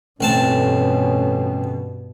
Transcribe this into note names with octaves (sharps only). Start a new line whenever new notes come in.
A1 G2 B2 C4 C#4 A5